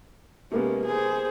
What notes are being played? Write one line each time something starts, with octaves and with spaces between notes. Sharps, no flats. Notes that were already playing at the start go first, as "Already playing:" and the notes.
C3 G#3 A#3 B3 C#4
G#4 C5